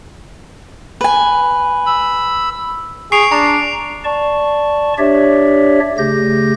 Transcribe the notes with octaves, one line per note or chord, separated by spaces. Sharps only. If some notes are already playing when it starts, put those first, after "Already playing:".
B4 G#5
B5 E6
G#4 C#6 C7 D7 F7
D4 A#5
D5 A5 C#6
D4 G4 C#5 D5 E5
C#3 A3 G4 G6 A#6